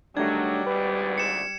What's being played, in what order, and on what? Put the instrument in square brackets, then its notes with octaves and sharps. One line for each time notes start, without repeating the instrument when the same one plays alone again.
[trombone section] D#3 F#3 [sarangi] G3 [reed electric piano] A3 D4 [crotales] G#6
[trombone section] G#1 D2 G#2 [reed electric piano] B4
[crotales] C#7 E7